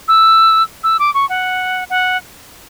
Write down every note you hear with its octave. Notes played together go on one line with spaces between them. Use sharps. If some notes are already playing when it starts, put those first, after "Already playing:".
E6
E6
D6
C#6
F#5
F#5